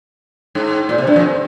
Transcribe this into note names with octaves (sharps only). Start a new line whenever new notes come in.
G#2
A#2
C3
G2
F2